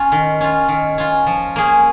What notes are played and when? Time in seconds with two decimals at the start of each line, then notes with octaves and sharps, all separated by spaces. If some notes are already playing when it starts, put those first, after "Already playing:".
Already playing: C#4 F4
0.12 D#3
0.41 C#4 F4
0.68 D#3
0.98 C#4 F4
1.27 F3
1.56 A#3 C#4 G#4